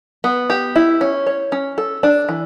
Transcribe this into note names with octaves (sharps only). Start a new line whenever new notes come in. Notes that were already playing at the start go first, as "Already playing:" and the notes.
B3
G4
E4
C#4
C#5
C#4
A4
D4
E3